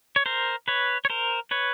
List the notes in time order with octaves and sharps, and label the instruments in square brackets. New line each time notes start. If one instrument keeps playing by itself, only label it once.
[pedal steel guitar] C#5
A#4 C5
B4 C#5
C#5
A#4 C5
B4 C#5